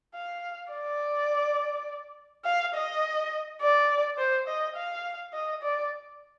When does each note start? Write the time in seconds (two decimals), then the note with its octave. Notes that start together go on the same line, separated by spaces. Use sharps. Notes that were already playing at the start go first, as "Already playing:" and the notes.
0.15 F5
0.72 D5
2.45 F5
2.74 D#5
3.61 D5
4.18 C5
4.48 D#5
4.76 F5
5.33 D#5
5.62 D5